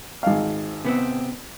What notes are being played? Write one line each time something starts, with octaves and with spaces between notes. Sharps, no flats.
G#1 F5
C3 B3 C4